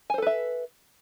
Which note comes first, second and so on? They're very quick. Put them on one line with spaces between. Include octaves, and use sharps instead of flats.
G#5 C5 A4 B4 E5